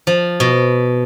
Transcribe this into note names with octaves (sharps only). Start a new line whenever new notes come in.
F3
B2